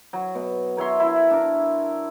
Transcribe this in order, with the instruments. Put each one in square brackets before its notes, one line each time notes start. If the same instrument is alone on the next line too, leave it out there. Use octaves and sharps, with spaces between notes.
[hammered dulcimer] F#3
B2
A#4 C#5 E5 C6
E4
D4 A#4